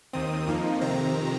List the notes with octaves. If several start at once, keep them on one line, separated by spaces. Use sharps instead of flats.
D#2 D#3 C4 D#6
F2 F3 A#3 D#4
F2 C3 D#3 C4 A#5